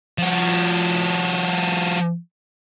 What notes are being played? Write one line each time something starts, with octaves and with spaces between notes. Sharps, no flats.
F3 F#4